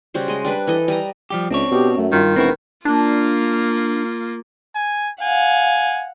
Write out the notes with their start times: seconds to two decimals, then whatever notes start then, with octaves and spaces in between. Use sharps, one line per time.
0.14 C#3 G3 F#4 C5
0.28 G#3 D#5
0.45 G3 D4 B4
0.67 E3 A4 D#5
0.88 G3 D#5 A#5
1.30 F3 G3 G4
1.50 C#2 C4 D4 C#5
1.71 B2 G4
1.98 F#2 A3
2.12 G2 D#3 F4
2.36 E1 C4 E4 F#4 B4
2.85 A#3 D4 F4
4.75 G#5
5.22 F5 F#5 G#5